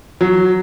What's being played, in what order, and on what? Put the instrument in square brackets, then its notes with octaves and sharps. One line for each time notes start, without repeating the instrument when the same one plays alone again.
[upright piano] F#3